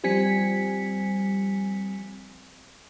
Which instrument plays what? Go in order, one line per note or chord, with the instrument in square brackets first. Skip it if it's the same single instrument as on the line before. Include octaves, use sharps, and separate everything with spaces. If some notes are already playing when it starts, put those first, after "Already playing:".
[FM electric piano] F3 G3 C4 G#5 B6 C#7